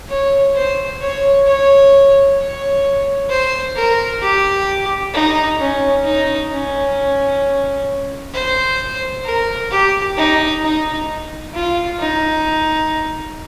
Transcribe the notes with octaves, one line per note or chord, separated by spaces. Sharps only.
C#5
C5
C#5
C#5
C#5
C5
A#4
G4
D#4
C#4
D#4
C#4
C5
A#4
G4
D#4
D#4
F4
D#4